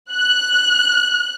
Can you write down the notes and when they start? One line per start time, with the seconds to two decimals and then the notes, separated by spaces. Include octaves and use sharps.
0.11 F#6